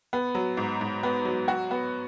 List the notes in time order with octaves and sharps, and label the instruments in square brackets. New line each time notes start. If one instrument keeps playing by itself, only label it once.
[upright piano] B3
F#3
G#2
G#2
B3
F#3
F#4
B3